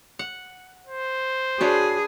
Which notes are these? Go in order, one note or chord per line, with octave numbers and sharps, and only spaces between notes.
F#5
C5
D4 F#4 G#4 B4 C#5